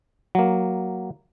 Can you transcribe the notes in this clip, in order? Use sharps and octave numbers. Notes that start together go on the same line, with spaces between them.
F#3 A#3